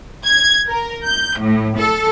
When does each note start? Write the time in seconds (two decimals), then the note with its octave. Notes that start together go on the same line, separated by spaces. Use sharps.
0.24 G#6
0.68 A#4
1.05 G6
1.39 A2
1.79 A4